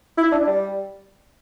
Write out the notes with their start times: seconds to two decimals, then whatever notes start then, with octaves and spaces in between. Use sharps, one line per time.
0.17 E4
0.32 D4
0.47 G3